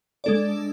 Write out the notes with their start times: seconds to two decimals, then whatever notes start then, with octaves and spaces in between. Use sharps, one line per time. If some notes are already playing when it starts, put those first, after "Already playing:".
0.24 G#3 D4 A4 D5